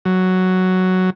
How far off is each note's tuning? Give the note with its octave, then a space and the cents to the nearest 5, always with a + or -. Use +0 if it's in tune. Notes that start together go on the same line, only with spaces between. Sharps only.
F#3 +5